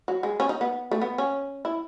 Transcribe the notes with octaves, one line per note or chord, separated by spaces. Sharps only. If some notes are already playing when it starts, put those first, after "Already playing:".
F#3
G#3
C#4
D#4
B3
A3
B3
C#4
E4